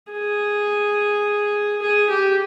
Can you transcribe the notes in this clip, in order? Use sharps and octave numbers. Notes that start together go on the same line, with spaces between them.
G#4
G#4
G4